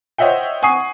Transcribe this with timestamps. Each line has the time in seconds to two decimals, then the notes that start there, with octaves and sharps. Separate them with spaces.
0.18 C5 C#5 D#5 E5 F#5 G5
0.62 F#5 G#5 C#6 D#6 C7